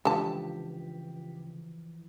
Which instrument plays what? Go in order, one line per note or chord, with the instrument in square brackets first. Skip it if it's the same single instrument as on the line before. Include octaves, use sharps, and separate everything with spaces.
[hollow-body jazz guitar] C#2 [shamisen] D3 A5 [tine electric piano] E3 F3 [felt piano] G4